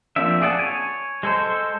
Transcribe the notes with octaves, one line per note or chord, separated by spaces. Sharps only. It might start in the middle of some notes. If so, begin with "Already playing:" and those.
F3 A#3 C4 D4 E5
G#4 D5 F#5 A5
C#5 G#5
G#3 A4 C5